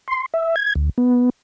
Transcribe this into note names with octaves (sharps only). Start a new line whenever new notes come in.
C6
E5
G#6
D2
B3